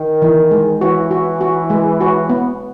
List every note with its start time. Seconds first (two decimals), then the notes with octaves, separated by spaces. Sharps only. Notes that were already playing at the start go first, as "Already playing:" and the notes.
Already playing: D#3
0.22 E3
0.51 G#3
0.81 E3 F#4
1.11 F#4
1.41 F#4
1.70 G#3
2.01 F#4
2.29 B3